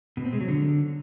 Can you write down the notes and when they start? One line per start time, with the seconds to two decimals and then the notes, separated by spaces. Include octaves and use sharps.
0.17 B2
0.25 C4
0.33 G#3
0.40 F#3
0.48 D3